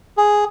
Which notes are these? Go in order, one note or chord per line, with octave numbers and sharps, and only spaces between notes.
G#4